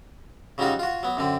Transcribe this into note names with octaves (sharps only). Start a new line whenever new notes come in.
C#3 F#3 G3 D#4 F4 F#4
F4 F#4
F#3 B3
F#2 D3 C4